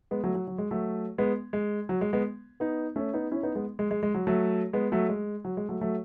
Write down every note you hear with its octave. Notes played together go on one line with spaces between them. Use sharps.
G#3 B3
F#3 A3
F#3
F#3
G#3
F#3 A3
G#3 B3
G#3
F#3
G#3
G#3 B3
B3 D#4
A3 C#4
B3 D#4
C#4 E4
B3 D#4
G#3 B3
G#3
G#3
G#3
F#3
F#3 A3
G#3 B3
F#3 A3
G#3
F#3
G#3
F#3 A3
F#3 A3